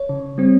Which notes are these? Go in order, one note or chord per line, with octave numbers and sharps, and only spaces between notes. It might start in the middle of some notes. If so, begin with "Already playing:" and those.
Already playing: C#5
C#3
G3 C4